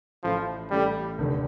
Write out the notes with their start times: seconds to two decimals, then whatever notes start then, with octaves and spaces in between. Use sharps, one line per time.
0.23 A1 A2 F3 A3
0.71 A1 A2 G3 A3
1.18 F1 D#2 D3 A3